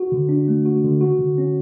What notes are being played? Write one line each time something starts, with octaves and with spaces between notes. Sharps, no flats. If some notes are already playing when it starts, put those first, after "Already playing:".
Already playing: F#4
D3
D4
A3
F#4
D3
F#4
D3
C#4